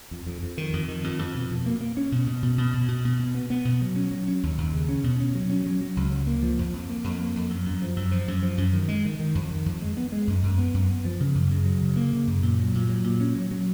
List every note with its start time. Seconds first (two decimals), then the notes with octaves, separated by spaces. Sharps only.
0.11 F2
0.26 F2
0.43 F2
0.58 D#3
0.73 F2
0.88 D#3
1.04 F2
1.19 F2
1.35 B2
1.51 B2
1.66 A#3
1.81 A#3
1.97 C#4
2.12 B2
2.27 B2
2.43 B2
2.58 B2
2.73 B2
2.88 B2
3.05 B2
3.19 B2
3.35 B3
3.50 B3
3.65 B2
3.82 F#3
3.96 C#4
4.11 F#3
4.28 C#4
4.43 D#2
4.58 D#2
4.73 C#3
4.89 C#4
5.04 B2
5.20 C#4
5.35 F#3
5.50 C#4
5.66 F#3
5.81 F#3
5.97 C#2
6.12 F#3
6.27 A#3
6.42 F3
6.59 F2
6.74 F2
6.89 A#3
7.04 F2
7.20 A#3
7.36 F2
7.50 F#2
7.66 F#2
7.82 F3
7.96 F#2
8.11 F3
8.28 F#2
8.43 F3
8.58 F#2
8.74 D#3
8.88 G#3
9.05 D#3
9.19 D#3
9.35 F2
9.51 D#3
9.66 F2
9.82 G#3
9.97 B3
10.12 G#3
10.27 F#2
10.43 F#2
10.58 B3
10.74 F#2
10.90 B3
11.05 F3
11.20 C#3
11.35 F#2
11.51 C#3
11.66 F#3
11.81 C#3
11.96 A#3
12.12 C#3
12.27 F#2
12.43 A#2
12.59 F#3
12.74 A#2
12.89 F#3
13.04 A#2
13.20 C#4
13.36 F#3
13.51 F#3